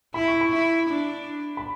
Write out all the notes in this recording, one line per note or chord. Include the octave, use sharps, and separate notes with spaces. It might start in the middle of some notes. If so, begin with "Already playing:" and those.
E4 B5
C#6
B5
E4
D4
B5